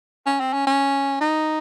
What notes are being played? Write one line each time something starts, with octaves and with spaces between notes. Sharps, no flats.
C#4
C4
C#4
C#4
D#4